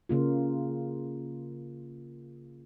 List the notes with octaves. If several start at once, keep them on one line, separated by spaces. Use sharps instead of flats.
C#3 A#3 F4